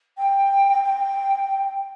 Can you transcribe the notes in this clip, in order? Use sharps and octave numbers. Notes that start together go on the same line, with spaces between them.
G5
G5